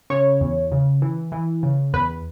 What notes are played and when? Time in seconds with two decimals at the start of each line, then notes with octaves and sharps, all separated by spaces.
0.10 C#3 C#5
0.41 E2
0.72 C#3
1.02 E3
1.32 E3
1.63 C#3
1.93 E2 B4